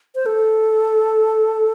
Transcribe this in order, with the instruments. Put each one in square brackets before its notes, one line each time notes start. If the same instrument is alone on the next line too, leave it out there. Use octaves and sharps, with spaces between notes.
[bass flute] C5
A4